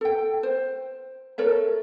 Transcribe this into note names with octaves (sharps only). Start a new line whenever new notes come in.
A4 G5
C5
A4 A#4 C#5 E5